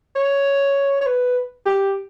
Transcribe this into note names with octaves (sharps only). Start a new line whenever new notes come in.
C#5
C#5
B4
G4